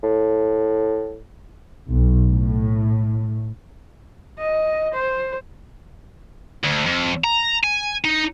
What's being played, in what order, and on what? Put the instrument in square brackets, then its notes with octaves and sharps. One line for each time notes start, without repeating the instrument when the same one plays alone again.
[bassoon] A2
[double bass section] B1
A2
[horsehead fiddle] D#5
C5
[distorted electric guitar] D2
F2
A#5
G#5
D#4